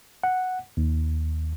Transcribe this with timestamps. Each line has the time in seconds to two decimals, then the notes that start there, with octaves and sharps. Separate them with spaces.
0.23 F#5
0.77 D#2